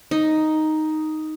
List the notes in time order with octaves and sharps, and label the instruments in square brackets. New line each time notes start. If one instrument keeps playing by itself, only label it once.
[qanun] D#4